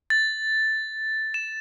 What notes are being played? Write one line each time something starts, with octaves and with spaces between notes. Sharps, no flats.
A6
E7